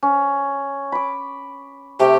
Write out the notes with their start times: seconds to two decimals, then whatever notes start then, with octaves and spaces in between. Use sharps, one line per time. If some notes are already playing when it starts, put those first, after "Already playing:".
0.03 C#4
0.92 B5 D6
1.99 C3 A3 G4